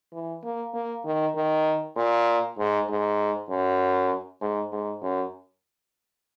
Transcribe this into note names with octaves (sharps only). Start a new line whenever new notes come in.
E3
A#3
A#3
D#3
D#3
A#2
G#2
G#2
F#2
G#2
G#2
F#2